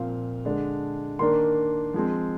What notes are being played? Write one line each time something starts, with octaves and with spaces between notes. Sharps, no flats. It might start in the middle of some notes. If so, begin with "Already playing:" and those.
Already playing: A#2 F3 C4 F5
D3 G#3 D4
D#3 A#3 D4 C6
F3 G#3 C4